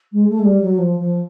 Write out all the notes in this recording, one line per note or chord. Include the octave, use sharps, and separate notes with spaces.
G#3
A3
G#3
G3
F#3
F3
F3